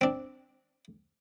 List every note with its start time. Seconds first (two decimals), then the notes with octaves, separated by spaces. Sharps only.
0.01 C4 D4